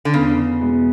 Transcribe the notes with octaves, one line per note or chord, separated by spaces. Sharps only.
D3
E2 C#3
B2 G#3 B3 E4